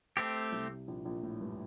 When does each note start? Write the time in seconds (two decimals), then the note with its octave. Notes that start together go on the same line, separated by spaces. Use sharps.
0.17 A3 C4 G4
0.52 C2 C3
0.88 A#1 A#2
1.05 A#1 A#2
1.23 A2
1.41 G2